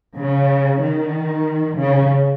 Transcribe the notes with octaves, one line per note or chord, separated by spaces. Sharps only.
C#3
D#3
C#3